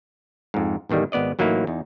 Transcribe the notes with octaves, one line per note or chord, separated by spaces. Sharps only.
F2 G#2
A1 E2 D#3 G3 G#3
G#1 B3 D5 D#5
A1 F#3 A#3 D#4 E4
E2 D#4